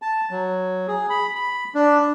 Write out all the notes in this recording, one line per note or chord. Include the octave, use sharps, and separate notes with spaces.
A5
F#3
G#4
B5
B5
D4